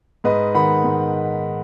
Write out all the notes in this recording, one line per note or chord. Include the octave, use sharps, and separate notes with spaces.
G#2 B4 D#5
D#3 F#5 B5
G#2